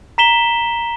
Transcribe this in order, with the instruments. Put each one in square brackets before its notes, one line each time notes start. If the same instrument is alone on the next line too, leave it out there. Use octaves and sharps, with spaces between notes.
[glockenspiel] A#5 B6 E7 G7